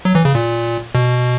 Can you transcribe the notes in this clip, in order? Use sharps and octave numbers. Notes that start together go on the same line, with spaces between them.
F#3
E3
C#3
A#2
B2